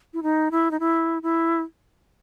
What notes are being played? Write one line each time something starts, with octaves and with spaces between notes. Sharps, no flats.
E4
D#4
E4
D#4
E4
E4